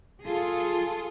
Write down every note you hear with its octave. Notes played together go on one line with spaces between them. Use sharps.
F4 G#4 A4